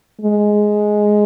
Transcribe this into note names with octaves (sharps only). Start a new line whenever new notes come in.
G#3